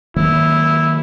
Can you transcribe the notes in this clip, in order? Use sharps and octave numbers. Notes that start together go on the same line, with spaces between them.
D#3 F#3 A#3 E4